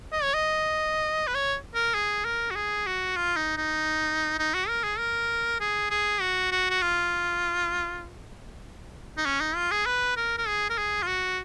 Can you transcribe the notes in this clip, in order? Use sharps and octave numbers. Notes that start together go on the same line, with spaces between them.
D#5
C#5
D#5
B4
C#5
A#4
G#4
A#4
F#4
G#4
F#4
F4
D#4
D#4
D#4
F#4
A#4
G#4
A#4
G#4
G#4
F#4
F#4
F#4
F4
D#4
C#4
D#4
F4
G#4
B4
A#4
A#4
G#4
A#4
G#4
F4
F#4